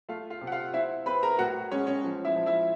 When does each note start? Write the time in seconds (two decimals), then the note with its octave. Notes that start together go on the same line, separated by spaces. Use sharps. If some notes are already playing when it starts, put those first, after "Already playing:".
0.09 A3 F4 F5
0.30 F4 F5
0.41 C3
0.47 F#5
0.52 F4 F5
0.74 C4 E4 E5
1.06 C4 B4 B5
1.23 A#4 A#5
1.39 A2 F#4 F#5
1.71 G#3 C#4 C#5
1.87 C#4 C#5
2.04 F3
2.25 E4 E5
2.36 F3
2.46 E4 E5